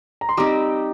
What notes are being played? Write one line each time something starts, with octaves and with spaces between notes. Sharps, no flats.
A#5
C6
G3 C4 D#4 A#5 D6